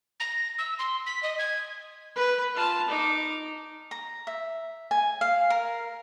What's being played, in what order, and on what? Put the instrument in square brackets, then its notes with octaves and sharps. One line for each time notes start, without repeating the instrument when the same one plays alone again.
[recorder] A#6
E6
C6
B6
D#5
G#6
[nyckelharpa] B4
F4 A5
D#4 D6
[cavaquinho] A#5
E5
G#5
F5
A#4